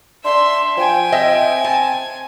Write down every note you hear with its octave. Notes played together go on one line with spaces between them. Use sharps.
D4 E5 C6
F3 G5 G#5
C4 D#5 E5
A5